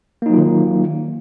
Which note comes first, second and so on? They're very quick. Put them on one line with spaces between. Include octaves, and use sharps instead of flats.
A#3 D#4 F#3 F4 D#3